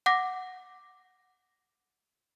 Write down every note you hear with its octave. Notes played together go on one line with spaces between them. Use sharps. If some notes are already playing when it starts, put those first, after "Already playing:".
F#5 D6 A#6